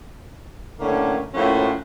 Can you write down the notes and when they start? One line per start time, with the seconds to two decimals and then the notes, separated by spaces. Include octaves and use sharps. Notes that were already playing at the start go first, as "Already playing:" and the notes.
0.80 A2 D3 A#3 C#4
1.34 A2 F3 A#3 C#4 F#4